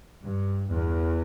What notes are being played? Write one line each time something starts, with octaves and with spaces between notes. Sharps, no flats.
G2
E2